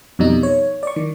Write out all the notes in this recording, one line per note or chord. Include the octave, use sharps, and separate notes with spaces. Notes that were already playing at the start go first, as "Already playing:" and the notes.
F2 B2 G3 D#4
C#5
D5 C#6
D#3